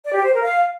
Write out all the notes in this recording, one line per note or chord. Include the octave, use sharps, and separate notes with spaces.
D5
G4
C5
A#4
F5